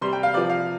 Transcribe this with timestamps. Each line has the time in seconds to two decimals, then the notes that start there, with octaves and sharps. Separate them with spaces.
0.01 C3 G3 C6
0.13 G5
0.23 F5
0.34 C3 D5
0.37 F3
0.49 F5